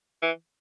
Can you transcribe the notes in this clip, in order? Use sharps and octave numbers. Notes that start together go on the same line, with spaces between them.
E3